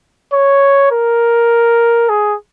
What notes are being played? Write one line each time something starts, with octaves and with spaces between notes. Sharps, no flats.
C#5
A#4
G#4